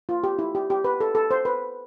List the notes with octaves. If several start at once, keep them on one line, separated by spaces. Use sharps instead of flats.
F4
G4
E4
G4
G4
B4
A4
A4
C5
B4